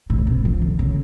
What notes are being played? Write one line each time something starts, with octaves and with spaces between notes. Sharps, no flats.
A2
C3
F3
D3
C#3